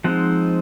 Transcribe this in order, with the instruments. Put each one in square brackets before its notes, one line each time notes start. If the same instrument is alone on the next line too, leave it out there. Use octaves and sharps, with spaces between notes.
[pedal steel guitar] F3 G#3 C4 D#4 F#5